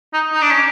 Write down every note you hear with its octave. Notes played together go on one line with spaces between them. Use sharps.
D#4
D#4
D4
C#4